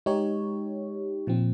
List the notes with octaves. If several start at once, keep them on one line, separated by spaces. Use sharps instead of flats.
G#3 D#4 G4 C#5
A#2 F3 C4